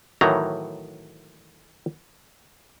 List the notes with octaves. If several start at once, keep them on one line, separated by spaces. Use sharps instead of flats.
A2 D#3 E3 F#3 A#5